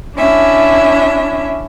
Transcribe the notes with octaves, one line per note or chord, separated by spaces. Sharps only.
C#4 D4 E4 E5